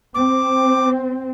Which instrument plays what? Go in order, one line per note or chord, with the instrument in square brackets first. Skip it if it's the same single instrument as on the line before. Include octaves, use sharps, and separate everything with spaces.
[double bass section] C4 [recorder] D6